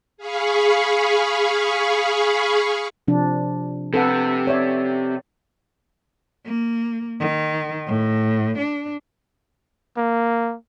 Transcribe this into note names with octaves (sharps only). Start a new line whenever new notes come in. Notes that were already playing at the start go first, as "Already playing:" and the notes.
G#4 F5 B5 C#6
C3 F3 D4
C3 A4 B4 F#5
C#5 D5 E5
A#3
D#3
A2
D4
A#3